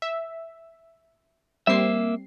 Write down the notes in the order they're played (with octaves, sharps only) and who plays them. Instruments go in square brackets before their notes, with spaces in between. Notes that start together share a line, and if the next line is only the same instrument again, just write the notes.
[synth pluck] E5
[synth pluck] G3 C4 C7 [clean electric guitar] A#3 E5